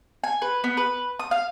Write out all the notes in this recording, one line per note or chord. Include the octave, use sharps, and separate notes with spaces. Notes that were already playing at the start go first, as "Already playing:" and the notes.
G#5
B4
B3
B4
D#6
F5